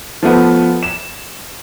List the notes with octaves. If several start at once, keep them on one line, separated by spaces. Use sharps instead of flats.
F3 A3 B3
E7